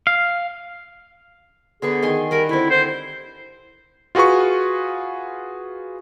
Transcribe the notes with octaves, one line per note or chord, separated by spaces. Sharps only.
F5
D3 B3 G#4 C#6
D#3 G#5 C6
G3 A#4 F#5 B5
D3 C4 E4
C5
F4 F#4 G#4 B4 C#6